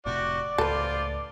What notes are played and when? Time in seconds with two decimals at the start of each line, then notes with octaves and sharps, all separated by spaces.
0.06 F1 A2 C3 F#4 G4 D5
0.58 C#2 A2 F4 A4 B4 C5